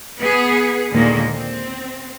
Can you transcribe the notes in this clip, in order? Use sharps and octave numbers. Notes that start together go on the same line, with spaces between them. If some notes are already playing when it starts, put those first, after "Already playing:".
B3 G#4
D#2 A#2 D3 D#3 G#3 A#3
C4